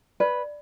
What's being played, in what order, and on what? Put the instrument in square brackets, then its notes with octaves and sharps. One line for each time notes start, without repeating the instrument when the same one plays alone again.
[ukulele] B4 [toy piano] D5